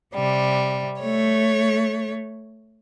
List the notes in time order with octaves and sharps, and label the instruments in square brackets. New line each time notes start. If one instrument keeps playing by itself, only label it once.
[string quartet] C3 G3
A3 C#5